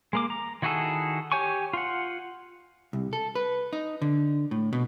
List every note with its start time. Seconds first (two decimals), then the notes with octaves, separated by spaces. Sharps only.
0.13 G#3 A#3 D6
0.30 A#5
0.62 D#3 E4 F#4 G#4 A4
1.32 G4 C#5 G#5 C#6
1.73 F4 F#5
2.93 C2
3.13 A4
3.35 B4
3.73 D#4
4.02 D3
4.51 A2
4.73 B2